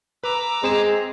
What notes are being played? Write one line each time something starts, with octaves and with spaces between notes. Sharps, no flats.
B4 A#5 D6 E6
G#3 C4 E7